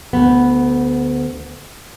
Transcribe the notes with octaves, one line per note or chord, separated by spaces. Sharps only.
D2 B3